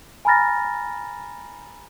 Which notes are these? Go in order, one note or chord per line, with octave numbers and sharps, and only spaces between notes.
G#5 A#5 B5 F6 A6 A#6